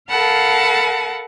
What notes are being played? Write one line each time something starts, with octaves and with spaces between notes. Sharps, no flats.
A4 A#4 F5 F#5 A5 B5